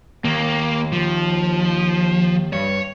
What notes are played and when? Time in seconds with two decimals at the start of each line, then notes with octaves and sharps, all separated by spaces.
0.25 D#2 A#3
0.93 F3
2.53 G2 C#5